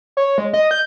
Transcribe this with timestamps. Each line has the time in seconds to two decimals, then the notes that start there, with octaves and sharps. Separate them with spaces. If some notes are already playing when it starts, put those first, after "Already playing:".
0.17 C#5
0.38 G#3
0.53 D#5
0.71 G6